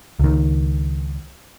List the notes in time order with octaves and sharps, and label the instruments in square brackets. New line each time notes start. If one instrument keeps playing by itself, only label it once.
[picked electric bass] C#2 D#3